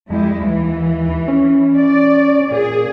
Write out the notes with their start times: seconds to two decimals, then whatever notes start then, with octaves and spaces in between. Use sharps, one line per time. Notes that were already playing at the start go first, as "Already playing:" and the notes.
0.10 F2 G3 G#3 E4
0.41 D#2 E3
1.28 C#4
1.76 D5
2.51 A#2 G#4